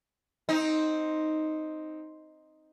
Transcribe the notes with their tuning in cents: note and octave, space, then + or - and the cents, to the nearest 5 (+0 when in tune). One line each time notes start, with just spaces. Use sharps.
C4 +0 D#4 +0